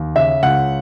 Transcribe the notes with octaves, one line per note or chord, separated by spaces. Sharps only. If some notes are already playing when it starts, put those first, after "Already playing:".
Already playing: D#2
C#3 E5
C#2 F#5